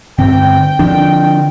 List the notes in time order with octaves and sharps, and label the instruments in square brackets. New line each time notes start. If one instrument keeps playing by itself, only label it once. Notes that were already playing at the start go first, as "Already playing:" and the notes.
[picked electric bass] G2 D3 C4 [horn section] G5
[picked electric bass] D3 F3 D4